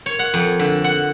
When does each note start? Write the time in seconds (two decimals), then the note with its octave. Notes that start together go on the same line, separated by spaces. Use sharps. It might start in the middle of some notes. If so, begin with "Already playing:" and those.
0.06 C#5
0.19 F#5
0.34 F2
0.60 D3
0.84 F#5